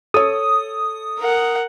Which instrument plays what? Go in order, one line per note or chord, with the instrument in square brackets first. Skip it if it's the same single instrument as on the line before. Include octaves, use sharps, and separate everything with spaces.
[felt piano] A4 C#5 [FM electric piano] D#6
[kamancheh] A#4 F#5